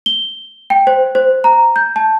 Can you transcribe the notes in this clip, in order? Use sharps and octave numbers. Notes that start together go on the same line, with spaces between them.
G7
G5
C5
C5
A#5
G6
A5